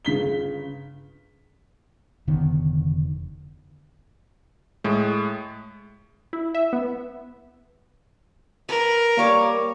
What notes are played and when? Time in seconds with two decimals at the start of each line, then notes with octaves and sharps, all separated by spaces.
0.05 G1 C#3 B6 G7
2.27 F1 D3 D#3 B3
4.84 A2 G#3
6.33 E4
6.54 E5
6.73 B3
8.69 A#4 B4
9.18 G3 A#3 C#5 D6